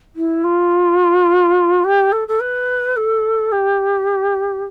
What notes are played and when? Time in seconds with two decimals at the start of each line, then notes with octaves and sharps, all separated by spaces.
0.16 E4
0.44 F4
1.84 G4
2.12 A4
2.28 A4
2.40 B4
2.96 A4
3.52 G4